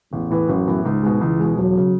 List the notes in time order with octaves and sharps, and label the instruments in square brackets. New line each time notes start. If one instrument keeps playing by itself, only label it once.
[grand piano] A1 [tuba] E2
[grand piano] A2 E3 B3
[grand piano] A1 [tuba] F#2
[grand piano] A2 E3 B3
[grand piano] C#2 [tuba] G#2
[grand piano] B2 G#3
[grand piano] C#2 [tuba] E3
[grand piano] B2 G#3
[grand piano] E1 [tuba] F#3
[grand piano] C#3